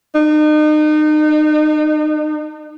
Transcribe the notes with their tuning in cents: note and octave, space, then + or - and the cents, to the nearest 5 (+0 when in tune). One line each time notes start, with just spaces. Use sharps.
D#4 -35